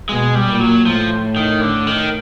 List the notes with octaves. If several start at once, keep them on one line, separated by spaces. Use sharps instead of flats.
B2 G#3
G3
A#2
F#3
A2 F3
D#3
D3
D#3